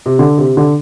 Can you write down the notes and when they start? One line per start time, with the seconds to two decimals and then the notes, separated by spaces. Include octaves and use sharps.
0.06 C3
0.19 D3
0.38 C3
0.57 D3